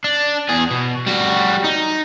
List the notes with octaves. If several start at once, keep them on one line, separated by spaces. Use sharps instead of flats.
D4
E2 G#4
B2
G3 F#4
D#4